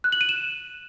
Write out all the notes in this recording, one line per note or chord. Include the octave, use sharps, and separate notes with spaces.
F#6
F#7
D#7
E7